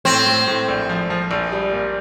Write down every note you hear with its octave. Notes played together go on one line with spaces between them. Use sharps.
A2 C4
A2
A2
A#1
F3
F3
A#1
G3
A#2